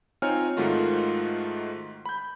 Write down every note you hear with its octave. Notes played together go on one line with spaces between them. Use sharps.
C4 D#4 F4 C#5 G#5 F6
G#2 D#3 A3 F4 F#4
B5 G6